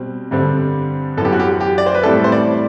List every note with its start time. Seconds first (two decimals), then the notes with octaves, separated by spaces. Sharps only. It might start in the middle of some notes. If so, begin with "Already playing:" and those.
Already playing: B2 G3 C4
0.31 G2 D3 G3 C4
1.17 F#2 E3 B3 A4
1.25 G4
1.32 F#4
1.40 G4
1.61 G4
1.78 D5
1.86 C5
1.95 B4
2.03 A2 E3 G3 C4 E4 A4
2.24 C5
2.32 D5